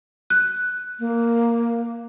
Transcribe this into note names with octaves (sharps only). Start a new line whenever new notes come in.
F#6
A#3